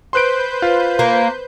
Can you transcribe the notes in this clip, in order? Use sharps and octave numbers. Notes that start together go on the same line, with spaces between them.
B4 C5 C6 F#6 G6 D7
F4
A#3